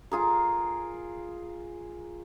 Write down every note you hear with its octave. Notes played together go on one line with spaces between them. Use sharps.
F4 G#4 A#4